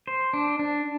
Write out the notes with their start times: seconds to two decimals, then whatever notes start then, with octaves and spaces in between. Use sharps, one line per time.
0.07 C5
0.33 D4
0.59 D4